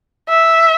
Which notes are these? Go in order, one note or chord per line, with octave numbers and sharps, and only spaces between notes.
E5